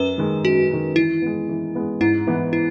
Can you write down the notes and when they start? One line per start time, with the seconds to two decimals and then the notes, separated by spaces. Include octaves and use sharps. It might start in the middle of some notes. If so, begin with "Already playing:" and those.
Already playing: F#2 B4
0.18 D#3 G#3
0.45 F#2 F#4
0.71 D#3 G#3
0.96 E3 E4
1.22 G#3 B3
1.49 E3
1.75 G#3 B3
2.00 G#2 E4
2.27 E3 B3
2.53 E4